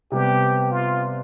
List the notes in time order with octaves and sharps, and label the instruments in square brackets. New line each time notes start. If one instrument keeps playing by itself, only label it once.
[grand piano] C3 G3 B3 [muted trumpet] G4
[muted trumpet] F4